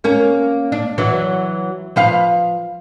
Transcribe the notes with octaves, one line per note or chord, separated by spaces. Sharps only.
A#3 C#4
D4
E3 F#3
F3 B4 F5